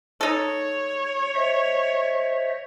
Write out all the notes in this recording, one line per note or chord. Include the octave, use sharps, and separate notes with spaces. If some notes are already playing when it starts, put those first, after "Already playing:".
D#4 A4 C#5
C5 D#5 E5